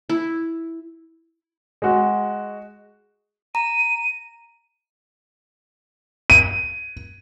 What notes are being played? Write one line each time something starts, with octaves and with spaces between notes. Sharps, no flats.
E4
G#3 F#4
A#5 D#7
D#7